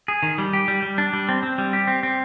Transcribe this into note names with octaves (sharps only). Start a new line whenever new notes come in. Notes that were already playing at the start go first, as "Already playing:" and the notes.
G#4
D#3
G3
G4
G3
G3
D4
G3
C4
C4
G3
G4
C4
C4